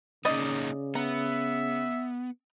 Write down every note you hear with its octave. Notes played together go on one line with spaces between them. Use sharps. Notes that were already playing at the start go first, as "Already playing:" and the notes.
C#3 A#3 C#4 D#4 D5 D#5
B3 E5 A#5